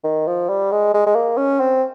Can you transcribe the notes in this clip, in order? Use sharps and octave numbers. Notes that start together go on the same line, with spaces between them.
D#3
F3
G3
G#3
G#3
G#3
A#3
C#4
C4